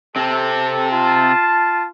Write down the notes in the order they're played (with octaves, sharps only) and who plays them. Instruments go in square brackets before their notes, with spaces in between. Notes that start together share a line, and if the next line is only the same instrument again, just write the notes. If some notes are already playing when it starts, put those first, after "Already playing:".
[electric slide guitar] C3 C4 [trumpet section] A4
[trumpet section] F4 A5